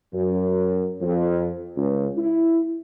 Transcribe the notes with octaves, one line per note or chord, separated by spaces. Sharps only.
F#2
F2
C#2
E4